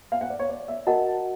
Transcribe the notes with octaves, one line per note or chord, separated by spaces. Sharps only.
F5
F#5
D5
C#5
D5
E5
F#4 A#4 D#5 F#5 A5